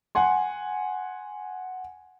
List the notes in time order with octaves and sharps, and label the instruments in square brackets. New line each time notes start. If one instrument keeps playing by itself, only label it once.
[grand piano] F#5 G#5 C6